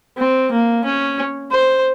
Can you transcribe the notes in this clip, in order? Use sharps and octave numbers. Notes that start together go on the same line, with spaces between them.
C4
A#3
C#4
C5